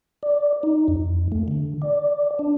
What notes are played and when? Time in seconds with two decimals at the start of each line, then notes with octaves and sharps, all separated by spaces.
0.23 D5
0.63 D#4
0.88 F2
1.32 A3
1.48 D3
1.82 D5
2.39 D4